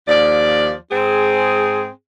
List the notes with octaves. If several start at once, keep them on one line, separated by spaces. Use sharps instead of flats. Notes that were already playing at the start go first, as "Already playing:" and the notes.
D#2 F3 D5
G#2 C4 G#4